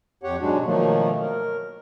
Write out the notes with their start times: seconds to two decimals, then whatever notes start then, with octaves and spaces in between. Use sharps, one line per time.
0.23 F2 G4 C#5 F#5
0.40 G#2 B2 F#3 G#3 D4 F#4
0.65 B2 D#3 F3 F#3 A3 A#3
1.22 A#4